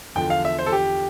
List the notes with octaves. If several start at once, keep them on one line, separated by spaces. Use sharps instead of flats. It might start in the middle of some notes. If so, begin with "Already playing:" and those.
E2 D3 F3 G5
F5
E5
C5
A4
G4